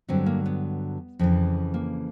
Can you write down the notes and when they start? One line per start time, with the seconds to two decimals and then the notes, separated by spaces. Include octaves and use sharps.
0.08 G2 D3 F#3 C4
0.26 A#3
0.46 B3
1.19 F2 C#3 E3
1.74 A#3